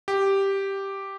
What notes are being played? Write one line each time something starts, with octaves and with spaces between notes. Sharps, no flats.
G4